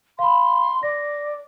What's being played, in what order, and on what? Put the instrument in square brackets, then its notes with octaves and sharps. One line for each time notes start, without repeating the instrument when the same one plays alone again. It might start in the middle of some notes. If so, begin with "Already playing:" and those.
[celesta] F5 B5 [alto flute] C6
[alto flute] D5 [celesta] A#6